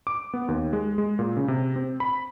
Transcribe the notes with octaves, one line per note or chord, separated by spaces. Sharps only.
D6
B3
D#2
G#3
G#3
A#2
C#3
C3
C4
B5